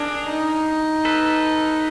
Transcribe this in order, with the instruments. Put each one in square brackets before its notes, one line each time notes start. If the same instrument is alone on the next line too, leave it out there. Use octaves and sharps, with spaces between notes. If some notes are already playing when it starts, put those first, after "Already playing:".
Already playing: [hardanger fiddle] D4 [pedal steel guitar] G#4 A#4
[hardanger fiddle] D#4
[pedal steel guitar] A4 B4